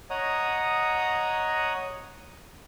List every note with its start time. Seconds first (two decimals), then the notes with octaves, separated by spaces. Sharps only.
0.10 C#5 D#5 F#5 A#5 D#6